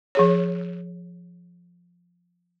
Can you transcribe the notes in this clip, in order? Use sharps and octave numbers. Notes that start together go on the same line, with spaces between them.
F3 G#4 C#5